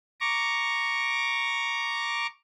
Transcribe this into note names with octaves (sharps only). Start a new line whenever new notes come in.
A#5 C#6 D6